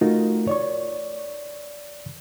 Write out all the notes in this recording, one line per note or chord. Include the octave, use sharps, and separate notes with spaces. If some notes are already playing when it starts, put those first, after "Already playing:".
A3 D#4 F4 F#4 A#4
C#5 D5 C#6